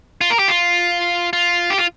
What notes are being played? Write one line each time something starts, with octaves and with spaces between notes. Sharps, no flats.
F4
A#4
G4
F4
F4
G4
F4